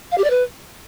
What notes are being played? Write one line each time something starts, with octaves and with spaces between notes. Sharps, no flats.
F5
G4
D5
B4